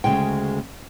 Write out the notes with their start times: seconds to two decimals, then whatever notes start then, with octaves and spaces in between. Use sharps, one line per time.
0.04 D2 C#3 G#3 G5